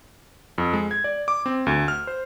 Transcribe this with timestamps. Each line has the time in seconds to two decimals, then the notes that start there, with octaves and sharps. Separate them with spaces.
0.58 F2
0.73 G#3
0.91 G#6
1.04 D5
1.28 D6
1.46 C4
1.66 D2
1.88 F6
2.07 C5